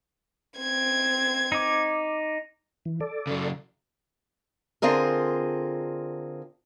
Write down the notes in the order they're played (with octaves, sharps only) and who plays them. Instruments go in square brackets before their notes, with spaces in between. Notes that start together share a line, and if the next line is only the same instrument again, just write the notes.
[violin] C4 G#6
[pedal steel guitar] D#4 D6
[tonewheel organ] E3
A4 D5
[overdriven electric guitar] C#3 F#3
[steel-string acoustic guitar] D3 C4 F4 G#4 A#4